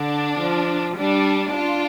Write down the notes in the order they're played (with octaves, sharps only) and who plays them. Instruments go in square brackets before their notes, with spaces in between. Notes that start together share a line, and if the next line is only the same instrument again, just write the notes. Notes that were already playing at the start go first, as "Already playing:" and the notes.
Already playing: [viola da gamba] D3 [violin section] D4
[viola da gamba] F3
[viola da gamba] G3 [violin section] D4
[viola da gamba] D4 [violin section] F4